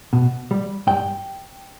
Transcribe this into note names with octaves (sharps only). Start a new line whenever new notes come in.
B2
G3
G2 G5